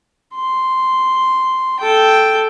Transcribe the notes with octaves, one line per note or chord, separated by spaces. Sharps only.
C6
A4 G5